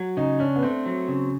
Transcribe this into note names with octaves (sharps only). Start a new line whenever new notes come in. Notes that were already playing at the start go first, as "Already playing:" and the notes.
Already playing: F#3
C#3 D#4
C#4 D4
B3
A3 C4
F#3
C#3